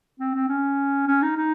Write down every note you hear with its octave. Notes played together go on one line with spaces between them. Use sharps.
C4
C4
C#4
C#4
D#4
D#4